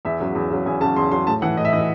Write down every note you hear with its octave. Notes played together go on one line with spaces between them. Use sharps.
E2 E5
C#3 F#3
E2
C#3 F#3
E2 G#5
C#3 F#3 A5
E2 C6
C#3 F#3 C6
A2 A5
E3 F#5
A2 D#5
E5
E3 D#5